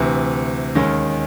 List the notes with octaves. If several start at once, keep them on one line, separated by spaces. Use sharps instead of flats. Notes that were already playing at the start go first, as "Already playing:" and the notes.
Already playing: D2 C3 E3
D#2 D#3 G#3 C#4